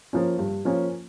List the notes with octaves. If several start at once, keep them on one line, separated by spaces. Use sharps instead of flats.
F3 A#3 C#4
G2
F3 A#3 C#4